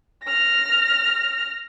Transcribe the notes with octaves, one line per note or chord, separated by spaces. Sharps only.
F6 A#6